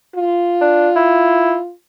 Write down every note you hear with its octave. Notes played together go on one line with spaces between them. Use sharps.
F4
D4
E4